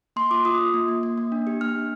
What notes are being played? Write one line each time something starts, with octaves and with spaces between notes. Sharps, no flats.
A#3 C6
F4 D6
F4 D#6
F4
A#3
A#3
A#3
A#3
D4
G4
A#3 F6
D4